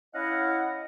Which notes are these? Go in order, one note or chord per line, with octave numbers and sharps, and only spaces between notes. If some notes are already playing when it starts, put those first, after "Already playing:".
C#4 E4 D#5 F5 F#5